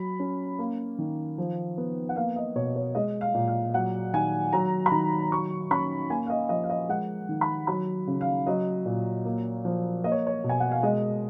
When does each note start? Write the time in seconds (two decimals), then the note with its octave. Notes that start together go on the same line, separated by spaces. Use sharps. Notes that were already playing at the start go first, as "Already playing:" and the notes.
Already playing: F#3 B5
0.20 C#4
0.59 A#3
0.99 D#3
1.38 F3
1.78 B3
2.09 F#5
2.16 A#3 F5
2.36 D#5
2.55 B2 C#5
2.76 C#5
2.95 G#3 D#5
3.21 F5
3.34 A#2
3.48 F5
3.74 F#3 F#5
4.14 D#3 G#5
4.53 F#3 A#5
4.86 B5
4.92 D#3 A#5
5.32 F#3 C#6
5.71 C#4 B5
6.10 A#3 G#5
6.26 F5
6.30 D#5
6.49 F3 D#5
6.64 F5
6.70 D#5
6.89 G#3 F#5
7.29 D#3
7.41 B5
7.67 F#3 B5
8.07 C#3
8.21 F5
8.47 F#3 D#5
8.86 A#2
9.25 A#3
9.65 F3
10.04 A#3 D#5
10.12 C#5
10.27 C#5
10.44 B2
10.49 G#5
10.60 F#5
10.71 F5
10.83 G#3 D#5